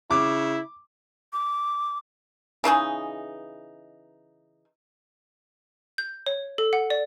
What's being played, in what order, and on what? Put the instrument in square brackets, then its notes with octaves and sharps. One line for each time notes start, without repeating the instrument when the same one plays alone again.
[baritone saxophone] C#3 [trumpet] E4 [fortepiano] D6
[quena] D6
[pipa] C#3 E3 D#4 G#4
[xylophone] G6
C#5
A4
F#5
D5